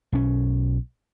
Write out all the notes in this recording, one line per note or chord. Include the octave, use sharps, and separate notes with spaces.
B1 C#4